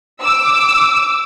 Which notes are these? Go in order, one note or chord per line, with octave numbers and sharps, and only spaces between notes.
D6 E6